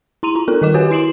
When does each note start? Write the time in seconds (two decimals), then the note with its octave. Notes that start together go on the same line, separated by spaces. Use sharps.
0.23 E4 A#5 C6 D#7 F7
0.35 F4 A#5
0.48 B3 F4 A4 A#4
0.62 D#3 A#4 D#5 D6 E7
0.74 F#4 G4 B4 C#5 F#5 G#5
0.91 E4 C6 C7 D7 E7 F#7